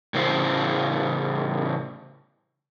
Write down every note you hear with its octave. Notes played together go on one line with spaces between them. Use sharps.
A2 C#3 E4 C5